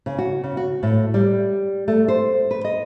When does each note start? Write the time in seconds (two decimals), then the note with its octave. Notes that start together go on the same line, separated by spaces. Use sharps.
0.06 C#3
0.18 F#4
0.44 C#3
0.57 F#4
0.83 A2
1.14 G3
1.88 A3
2.08 C5
2.51 B4
2.65 D#5